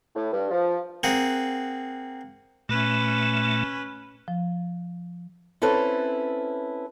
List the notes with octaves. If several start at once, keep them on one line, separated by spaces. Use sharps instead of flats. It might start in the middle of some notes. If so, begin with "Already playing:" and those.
A2
G2
F3
A#3 C4 G#4 F#5
A#2 A3 C#4 B4
F3
C4 C#4 E4 A4 B4